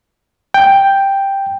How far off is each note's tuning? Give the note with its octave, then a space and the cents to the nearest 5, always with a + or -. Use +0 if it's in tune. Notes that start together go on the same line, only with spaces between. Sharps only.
G5 +5